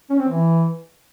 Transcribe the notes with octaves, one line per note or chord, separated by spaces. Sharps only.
C#4
C4
E3